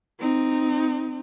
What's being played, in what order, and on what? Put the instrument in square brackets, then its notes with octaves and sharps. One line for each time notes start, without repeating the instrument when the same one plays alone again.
[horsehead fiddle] C4 D#4